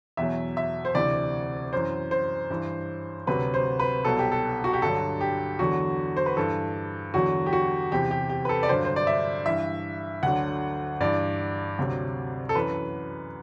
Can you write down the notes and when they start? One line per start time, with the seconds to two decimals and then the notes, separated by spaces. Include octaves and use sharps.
0.17 E2 B2 F#3 E5
0.57 E5
0.85 C5
0.95 D2 C3 E3 D5
1.73 F#2 E3 C5
2.11 C5
2.50 G2 E3
3.27 D2 C3 F#3 B4
3.54 C5
3.79 B4
4.05 C2 B2 F#3 A4
4.19 G4
4.32 A4
4.64 F#4
4.73 G4
4.82 G2 D3 F#3 A4
5.21 G4
5.59 E2 D3 F#3 F#4
6.16 C5
6.26 B4
6.36 G2 E3 A4
7.14 E2 D3 F#3 F#4
7.46 G4
7.53 F#4
7.92 E2 C3 E3 G4
8.11 G4
8.29 G4
8.45 B4
8.49 A4
8.63 D5
8.69 G2 D3 F#3 C5
8.85 C5
8.96 D5
9.07 E5
9.46 G2 E3 E5
10.23 D2 D3 F#3 F#5
11.01 G2 E3 D5
11.79 D2 C3 F#3
12.49 A4
12.55 F#2 E3 B4